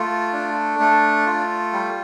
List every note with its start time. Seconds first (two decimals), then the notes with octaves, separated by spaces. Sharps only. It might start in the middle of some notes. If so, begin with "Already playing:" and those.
Already playing: A3 F4
0.33 D4
0.80 A3
1.26 F4
1.73 G3